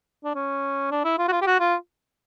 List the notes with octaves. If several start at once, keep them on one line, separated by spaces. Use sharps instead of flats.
D4
C#4
D4
E4
F4
F#4
F4
G4
F#4
F4